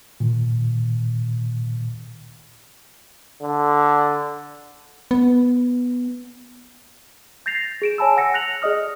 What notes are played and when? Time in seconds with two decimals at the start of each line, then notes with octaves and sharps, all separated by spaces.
0.20 A#2 D#3
3.42 D3
5.11 B3
7.46 G6 A6 A#6 C7 F7
7.82 G#4 D7 E7
7.98 C#5 G#5 A5 B5 E6
8.17 F#5 E6 A#6 C#7
8.34 F#6 A#6 C#7 F7 F#7
8.62 G#4 D5 D#5 D#6 F6